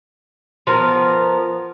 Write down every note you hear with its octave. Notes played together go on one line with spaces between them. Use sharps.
F3 B3 A#4